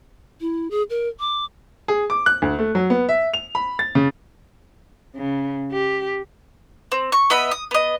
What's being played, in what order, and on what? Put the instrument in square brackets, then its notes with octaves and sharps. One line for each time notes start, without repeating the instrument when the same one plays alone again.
[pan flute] E4
G#4
A#4
D6
[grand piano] G#4
D6
F#6
D2
A3
F#3
B3
E5
F7
B5
A6
C#3
[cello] C#3
G4
[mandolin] C4
C#6
B3 D#5 E5 B5
D#6
B3 D#5